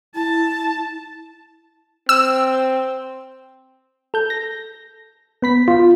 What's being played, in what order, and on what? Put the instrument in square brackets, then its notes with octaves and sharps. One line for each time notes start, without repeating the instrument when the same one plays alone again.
[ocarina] E4 [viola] A5
[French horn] C4 [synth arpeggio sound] E6
[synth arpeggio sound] A4 G6
A#6
B3 B5 B6
[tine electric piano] F4